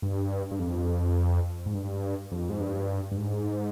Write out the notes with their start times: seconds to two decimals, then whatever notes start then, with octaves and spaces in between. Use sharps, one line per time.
0.02 G2
0.51 G2
0.59 F2
1.66 G#2
1.74 G2
2.32 F2
2.50 G#2
2.60 G2
3.11 G2
3.17 G#2